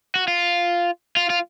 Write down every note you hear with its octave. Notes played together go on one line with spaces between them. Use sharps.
F#4
F4
F4
F4